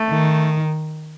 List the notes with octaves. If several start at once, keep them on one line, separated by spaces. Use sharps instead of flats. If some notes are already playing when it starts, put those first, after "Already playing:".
Already playing: A3
D#3